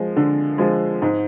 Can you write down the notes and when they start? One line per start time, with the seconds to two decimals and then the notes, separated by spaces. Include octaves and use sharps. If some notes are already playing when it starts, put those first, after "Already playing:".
Already playing: F3 G#3
0.16 D3
0.58 F3 G#3
1.02 G#2